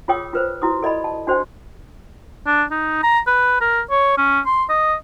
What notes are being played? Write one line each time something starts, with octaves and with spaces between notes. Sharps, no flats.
F4 G#4 C#5 G5 D#6 E6
F4 B4 C5
E4 F#4 D#6
A4 D5 D#5 B5
A5
D4 F#4 C5 D5 G5
D4
D#4
A#5
B4
A#4
C#5
C#4
C6
D#5